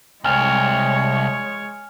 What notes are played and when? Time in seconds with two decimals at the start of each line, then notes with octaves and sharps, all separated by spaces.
0.24 C2 G#3 C#5 G#5 F6 F7